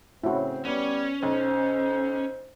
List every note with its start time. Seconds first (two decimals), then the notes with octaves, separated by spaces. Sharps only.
0.24 A2 C#3 C4 E4 F#4
0.65 G3 B3 C#4 C#5
1.23 B1 C5